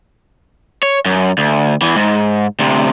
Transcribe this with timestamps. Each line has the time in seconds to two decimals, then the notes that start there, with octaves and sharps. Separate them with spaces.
0.83 C#5
1.06 F#2
1.38 D2
1.82 E2 E3
1.96 G#2
2.59 D2 C3